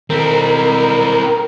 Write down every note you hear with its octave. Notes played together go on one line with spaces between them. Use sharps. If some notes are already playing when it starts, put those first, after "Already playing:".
B2 D#3 C4 E4 A4 A#4